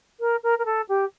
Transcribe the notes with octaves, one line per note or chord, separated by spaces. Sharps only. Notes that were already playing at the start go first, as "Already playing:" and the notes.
A#4
A#4
A#4
A4
G4